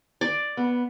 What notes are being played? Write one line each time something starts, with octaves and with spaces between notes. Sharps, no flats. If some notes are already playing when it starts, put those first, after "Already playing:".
D5
B3